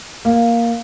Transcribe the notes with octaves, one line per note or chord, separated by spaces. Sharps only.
A#3